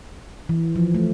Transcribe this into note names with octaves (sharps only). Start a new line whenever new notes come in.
E3
F3
A3